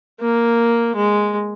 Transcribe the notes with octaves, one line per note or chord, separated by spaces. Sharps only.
A#3
G#3